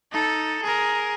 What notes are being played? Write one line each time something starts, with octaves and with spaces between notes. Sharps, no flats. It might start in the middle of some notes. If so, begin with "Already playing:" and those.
D#4 A4
G#4 A#4